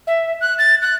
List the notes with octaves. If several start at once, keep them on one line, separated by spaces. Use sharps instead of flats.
E5
F#6
A6
F#6